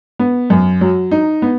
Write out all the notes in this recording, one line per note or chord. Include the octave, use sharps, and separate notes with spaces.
B3
F#2
F#3
D#4
B3